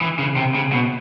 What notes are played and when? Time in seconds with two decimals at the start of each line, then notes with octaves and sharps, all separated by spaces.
0.01 E3
0.19 C#3
0.36 C3
0.55 C#3
0.72 B2